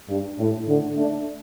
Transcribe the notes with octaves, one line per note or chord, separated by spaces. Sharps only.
G2
A2
A2 D3
A3 D4